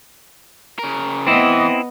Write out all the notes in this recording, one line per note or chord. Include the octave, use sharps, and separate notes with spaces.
C#3 A#4
E3 B3 C4 E4 D#5